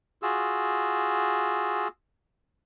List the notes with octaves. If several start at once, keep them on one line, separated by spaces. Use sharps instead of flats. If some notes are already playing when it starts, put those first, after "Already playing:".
F4 F#4 G#4 E6